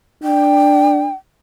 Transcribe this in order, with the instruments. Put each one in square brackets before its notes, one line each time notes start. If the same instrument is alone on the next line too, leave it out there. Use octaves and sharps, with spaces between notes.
[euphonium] D4 [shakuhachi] G5